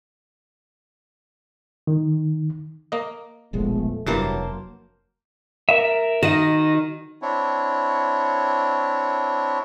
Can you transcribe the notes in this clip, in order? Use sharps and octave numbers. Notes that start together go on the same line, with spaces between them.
D#3
A#3 D#5
E1 A#1 F3 G#3 A3 B3
F1 G2 E3 F#3 A#3 C5 A5
A#4 E5
D#3 F#4 D#5
C4 D4 E4 C#5